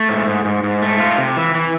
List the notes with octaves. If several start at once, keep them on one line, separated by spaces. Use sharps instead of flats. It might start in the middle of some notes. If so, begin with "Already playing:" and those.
Already playing: A3
G#2
G#2
G#2
G#2
A3
F4
C3
E3
E3